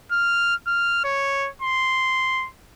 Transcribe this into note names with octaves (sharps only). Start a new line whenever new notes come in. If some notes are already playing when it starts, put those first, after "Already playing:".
F6
F6
C#5
C6